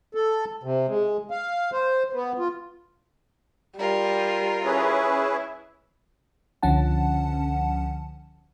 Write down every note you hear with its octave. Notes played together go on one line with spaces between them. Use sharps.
A4
C3
G#3
F5
C5
B3
F4
G3 F4 A#4
C#4 E4 G#4 B4
C#2 D3 F3 C#4 F#5 A5